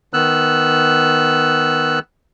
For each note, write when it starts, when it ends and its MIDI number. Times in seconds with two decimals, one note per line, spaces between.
0.13 1.99 51
0.13 1.99 59
0.13 1.99 88
0.13 1.99 90